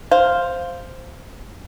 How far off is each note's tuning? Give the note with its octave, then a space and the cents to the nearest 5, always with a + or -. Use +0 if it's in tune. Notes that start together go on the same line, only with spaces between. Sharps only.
C5 +0 F5 +0